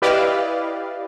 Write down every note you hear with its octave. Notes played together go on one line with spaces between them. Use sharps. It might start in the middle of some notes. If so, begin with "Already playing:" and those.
E4 G4 B4 D5 D#5 F5